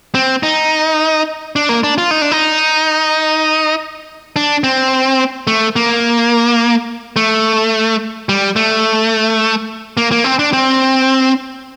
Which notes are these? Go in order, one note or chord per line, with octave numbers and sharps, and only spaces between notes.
C4
D#4
D4
A#3
D4
F4
D#4
D4
D#4
D4
C4
A3
A#3
A3
G3
A3
A#3
A#3
C4
D4
C4